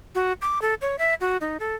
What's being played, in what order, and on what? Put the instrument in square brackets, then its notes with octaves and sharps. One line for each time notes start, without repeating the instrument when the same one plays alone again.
[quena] F#4
D6
A4
C#5
E5
F#4
D#4
A4